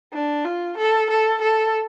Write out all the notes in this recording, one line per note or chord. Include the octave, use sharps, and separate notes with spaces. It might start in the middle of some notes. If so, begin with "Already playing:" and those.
D4
F4
A4
A4
A4